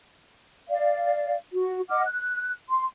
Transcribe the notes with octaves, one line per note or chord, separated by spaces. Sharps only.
D5 F5
F#4
D#5 F#5 D6 F6
F#6
C6